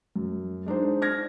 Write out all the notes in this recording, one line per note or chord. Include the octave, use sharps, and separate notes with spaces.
F#2
G#3 D4 D#4 C5
F6 G#6 A#6